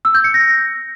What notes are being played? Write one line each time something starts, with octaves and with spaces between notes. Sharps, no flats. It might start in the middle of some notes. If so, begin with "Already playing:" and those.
E6
G6
C#7
A#6